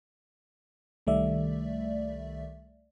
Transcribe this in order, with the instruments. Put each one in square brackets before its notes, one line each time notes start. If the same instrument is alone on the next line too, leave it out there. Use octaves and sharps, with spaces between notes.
[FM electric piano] C2 D#3 G3 A3 D5 E5